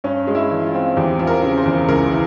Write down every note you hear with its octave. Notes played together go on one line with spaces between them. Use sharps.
G2 C#4
G#3
E4
E3
F4
C4
E2 G4
F3
A#4
C#3
C5
E2
C#2 A#4
E3